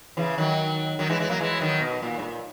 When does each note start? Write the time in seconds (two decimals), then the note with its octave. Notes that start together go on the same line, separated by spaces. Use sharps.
0.17 C#3 E3
0.38 D#3 F#3
0.99 D#3 F#3
1.09 E3 G#3
1.20 E3 G#3
1.30 F#3 A#3
1.40 E3 G#3
1.60 D#3 F#3
1.81 B2
2.02 A#2
2.19 G#2
2.22 A#2